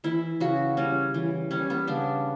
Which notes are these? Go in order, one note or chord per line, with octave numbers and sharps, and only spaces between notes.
E3 E4
C#3 F#4
G3 C#4
E3
G3 C#4
B3
C#3 D4